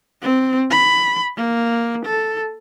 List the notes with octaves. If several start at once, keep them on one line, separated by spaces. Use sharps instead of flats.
C4
B5
A#3
A4